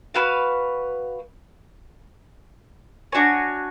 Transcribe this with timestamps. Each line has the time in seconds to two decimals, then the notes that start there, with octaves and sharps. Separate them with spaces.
0.14 F#4 B4 F5
3.12 D4 F#4 C#5 G#5